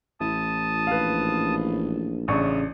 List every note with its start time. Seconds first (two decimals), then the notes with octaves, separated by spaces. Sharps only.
0.20 A1 E4 A5 D#6
0.87 A#1 B4 F5
2.28 A1 C#3 D4 E5 C#6 D#6